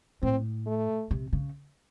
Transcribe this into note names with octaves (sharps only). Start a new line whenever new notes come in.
A2 C4
A3
C3
C#3